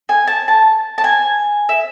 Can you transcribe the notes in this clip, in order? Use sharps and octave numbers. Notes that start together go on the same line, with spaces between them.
G#5
A5
A5
A5
G#5
E5